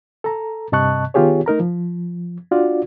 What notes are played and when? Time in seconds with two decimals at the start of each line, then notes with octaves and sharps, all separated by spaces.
0.24 A4 A#5
0.72 G2 C3 D#5 A5 C#6 F#6
1.14 D#3 B3 F4 G4 G#4 C#5
1.46 A3 D#4 A#4 A#5
1.60 F3
2.51 D4 F4 F#4 D5